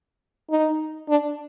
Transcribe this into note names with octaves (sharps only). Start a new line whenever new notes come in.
D#4
D4